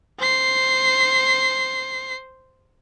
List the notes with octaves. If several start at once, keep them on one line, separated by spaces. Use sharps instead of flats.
C5 C7